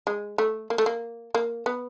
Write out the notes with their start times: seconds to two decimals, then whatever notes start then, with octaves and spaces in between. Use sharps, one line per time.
0.07 G#3
0.38 A3
0.70 A#3
0.78 A3
0.86 A#3
1.34 A#3
1.66 B3